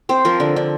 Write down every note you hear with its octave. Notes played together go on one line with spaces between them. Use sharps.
C4 C5
F3 A#4
D3
D3